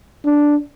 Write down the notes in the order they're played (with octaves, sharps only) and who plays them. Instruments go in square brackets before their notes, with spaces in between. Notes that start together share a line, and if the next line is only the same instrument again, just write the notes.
[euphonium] D4